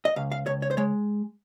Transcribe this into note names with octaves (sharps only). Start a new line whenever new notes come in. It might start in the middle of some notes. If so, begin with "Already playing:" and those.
D#5
C#2 F5
F5
C#2 C#5
C#5
C5
G#3 C#5